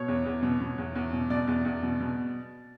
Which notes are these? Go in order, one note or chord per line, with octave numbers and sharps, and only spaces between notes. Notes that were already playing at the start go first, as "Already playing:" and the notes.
Already playing: B2 C#5
E2
E2
B2
B2
E2
E2
B2
B2 D5
E2
E2
B2
B2